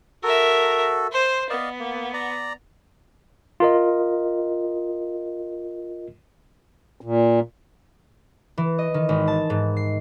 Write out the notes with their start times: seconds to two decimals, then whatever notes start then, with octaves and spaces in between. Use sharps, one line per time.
0.23 F#4 A4 A#4 E5
1.12 C5 C6
1.50 B3 D5 D#5 F5
1.80 A#3
2.14 D5 A#5
3.60 F4 A#4 D#5
7.01 A#2
8.57 E3
8.78 D#5
8.94 D#3
9.09 G#1
9.27 A5
9.50 G#2
9.77 C7